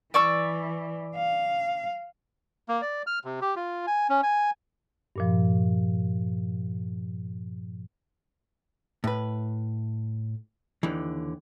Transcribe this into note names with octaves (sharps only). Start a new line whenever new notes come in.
E3 D5 C#6 E6
F5
A#3
D5
F6
C3
G4
F4
G#5
C#4
G#5
G2 A#2 F3
A2 B4
D#2 D3 E3